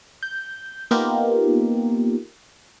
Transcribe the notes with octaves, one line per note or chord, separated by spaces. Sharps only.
G6
A#3 B3 D#4 F4 G4 A#4